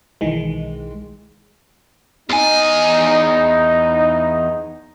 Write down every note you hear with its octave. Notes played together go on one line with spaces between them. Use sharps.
B1 D#3 E3 G#3
E2 D#4 G#5